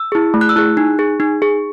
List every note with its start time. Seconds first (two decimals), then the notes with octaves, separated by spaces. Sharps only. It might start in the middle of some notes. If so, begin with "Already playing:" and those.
Already playing: E6
0.12 E4 G#4
0.34 A3
0.41 F#6
0.49 E6
0.56 E4 G#4 F#6
0.77 D#4
0.99 G#4
1.20 D#4
1.42 G#4